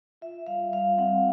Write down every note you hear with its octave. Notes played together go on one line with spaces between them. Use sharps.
F4 E5
G3 F5
G3 F5
C4 F#5